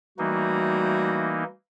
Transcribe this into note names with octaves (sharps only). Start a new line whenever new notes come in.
E3 G3 A3 A#3 D#4 F#4